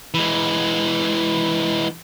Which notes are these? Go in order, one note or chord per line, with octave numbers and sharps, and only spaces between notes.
E3 G#3